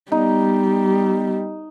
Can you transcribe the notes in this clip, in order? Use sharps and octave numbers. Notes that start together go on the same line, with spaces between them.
G3 B3 D#4